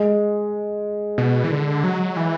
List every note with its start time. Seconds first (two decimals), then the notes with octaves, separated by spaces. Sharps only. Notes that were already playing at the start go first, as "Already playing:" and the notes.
Already playing: G#3
1.18 B2
1.44 E3
1.51 D3
1.84 F#3
2.17 E3